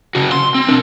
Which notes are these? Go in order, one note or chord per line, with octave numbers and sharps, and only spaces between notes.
C#3 F#4
C6
C4
D4 A#4